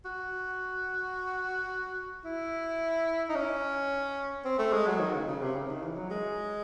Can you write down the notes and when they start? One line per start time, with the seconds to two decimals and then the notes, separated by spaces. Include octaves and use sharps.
0.05 F#4
2.25 E4
3.29 D#4
3.35 C#4
4.45 C4
4.58 A3
4.73 G#3
4.87 F#3
5.00 D#3
5.14 C#3
5.28 C#3
5.42 C3
5.55 C#3
5.69 D#3
5.83 E3
5.97 F#3
6.10 G#3